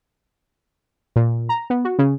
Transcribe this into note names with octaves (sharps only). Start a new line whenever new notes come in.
A#2
A#5
B3
F#4
C#3